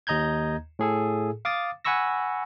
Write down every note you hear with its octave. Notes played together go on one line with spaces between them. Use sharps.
D#2 D#5 A#5 G6 G#6
A2 G#4 A4
F5 D6 D#6 A6
F#5 G#5 B5 C#6 E6 A#6